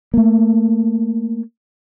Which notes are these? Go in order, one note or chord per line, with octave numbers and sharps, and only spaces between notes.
A3 A#3